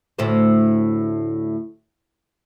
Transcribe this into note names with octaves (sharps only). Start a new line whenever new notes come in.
D2 A2 C5